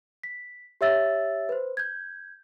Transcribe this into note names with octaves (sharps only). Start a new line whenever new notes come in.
B6
G4 C#5 E5 E6 A6
B4 C5
G6 G#6